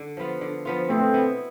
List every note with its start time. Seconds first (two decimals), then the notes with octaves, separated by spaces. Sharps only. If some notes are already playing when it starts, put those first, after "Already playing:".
Already playing: D3
0.17 F3 B3 F4
0.41 D3
0.65 F3 B3 F4
0.89 B2 A3 C4
1.14 B3 E4